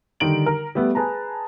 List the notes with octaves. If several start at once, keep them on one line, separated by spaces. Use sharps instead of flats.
D3 D#3 G3 D#4 D7 F#7
A#4
G3 A3 B3
G#4 B4 A5 A#5